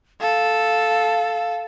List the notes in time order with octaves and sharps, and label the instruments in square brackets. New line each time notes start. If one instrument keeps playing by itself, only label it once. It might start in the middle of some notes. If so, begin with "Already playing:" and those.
[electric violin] A4 [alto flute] F5